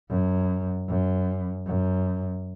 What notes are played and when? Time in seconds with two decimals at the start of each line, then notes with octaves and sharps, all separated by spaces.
0.11 F#2
0.89 F#2
1.67 F#2